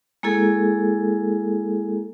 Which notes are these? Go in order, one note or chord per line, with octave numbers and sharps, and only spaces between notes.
G#3 A#3 E4 G#4 A4